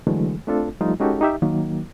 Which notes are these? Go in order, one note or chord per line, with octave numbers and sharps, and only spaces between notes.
D3 E3 F#3 G#3 A3
A3 C4 D4 F4 A4
F3 G3 A3 D#4 F4
G#3 C#4 D#4 F#4 G4 A4
D#4 G4 E5
D#3 F#3 A#3